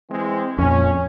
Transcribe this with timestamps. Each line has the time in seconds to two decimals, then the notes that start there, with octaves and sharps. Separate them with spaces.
0.10 E3 G#3 C4
0.58 F2 A#2 C#4